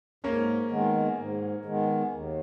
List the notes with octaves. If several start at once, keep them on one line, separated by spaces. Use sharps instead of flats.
G#2 A#3 C#4
D#3 G#3 B3
G#2
D#3 G#3 B3
D#2